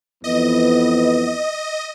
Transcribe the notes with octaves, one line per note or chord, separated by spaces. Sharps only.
F2 E3 B3 D#5